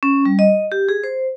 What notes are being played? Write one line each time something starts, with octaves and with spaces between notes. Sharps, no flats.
C#4
G3
D#5
G4
G#4
C5